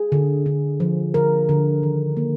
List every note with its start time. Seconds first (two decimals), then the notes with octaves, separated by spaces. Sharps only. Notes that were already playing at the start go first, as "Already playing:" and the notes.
Already playing: G#4
0.12 D3
0.46 D3
0.80 F3
1.14 D3 A#4
1.49 D3
1.83 D#3
2.17 A#3